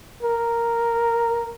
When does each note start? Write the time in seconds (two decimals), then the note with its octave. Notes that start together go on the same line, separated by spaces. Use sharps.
0.23 A#4